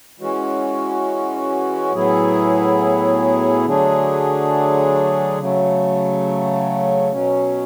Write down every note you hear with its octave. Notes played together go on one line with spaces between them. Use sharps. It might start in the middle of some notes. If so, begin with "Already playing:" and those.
E3 G#3 C#4 F#4
A2 F#3 B3 E4 G#4
D3 F#3 A3 D4 G#4
C#3 F#3 A3
B2 F#3 C#4